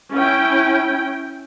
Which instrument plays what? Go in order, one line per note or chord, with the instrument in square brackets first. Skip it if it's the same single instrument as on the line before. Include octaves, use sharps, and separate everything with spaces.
[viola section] C#4 E4 G5